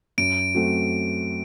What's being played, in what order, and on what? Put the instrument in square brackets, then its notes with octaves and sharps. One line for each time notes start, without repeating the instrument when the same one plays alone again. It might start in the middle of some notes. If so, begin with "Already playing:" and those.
[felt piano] F#2 [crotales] D7
[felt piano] F#3 A3 C4 F#4